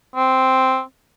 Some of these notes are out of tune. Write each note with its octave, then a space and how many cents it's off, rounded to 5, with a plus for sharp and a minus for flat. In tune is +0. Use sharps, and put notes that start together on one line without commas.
C4 +0